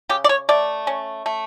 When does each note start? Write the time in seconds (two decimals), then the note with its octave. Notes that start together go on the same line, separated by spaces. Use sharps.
0.09 C#3 G4
0.24 D5
0.29 C#5
0.49 A3 D5
0.87 C#4
1.26 A3